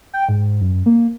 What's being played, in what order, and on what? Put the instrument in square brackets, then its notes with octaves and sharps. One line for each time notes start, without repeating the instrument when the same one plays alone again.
[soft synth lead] G5
G#2
F#2
A#3